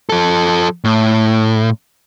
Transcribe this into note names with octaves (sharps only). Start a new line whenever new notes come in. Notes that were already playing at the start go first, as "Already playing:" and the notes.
F3 A4
A2